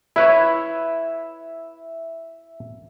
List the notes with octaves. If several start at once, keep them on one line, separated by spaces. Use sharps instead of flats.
E4 B4 C#5 E5